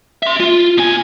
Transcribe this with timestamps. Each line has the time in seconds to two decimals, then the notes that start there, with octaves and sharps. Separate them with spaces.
0.23 E5 C6
0.40 F4
0.78 B2 G#5